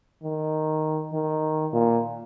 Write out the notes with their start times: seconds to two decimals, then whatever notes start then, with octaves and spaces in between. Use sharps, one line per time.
0.23 D#3
1.13 D#3
1.73 A#2